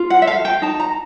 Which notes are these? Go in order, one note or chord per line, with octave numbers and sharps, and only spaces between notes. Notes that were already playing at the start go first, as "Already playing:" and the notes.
Already playing: F4
F#5
E5
A4 F5
G5
D#4 A5
A#5